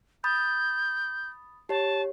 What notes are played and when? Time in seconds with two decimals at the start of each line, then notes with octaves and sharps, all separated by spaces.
0.24 B5 D#6 G6 A6
1.69 G4 C#5 A5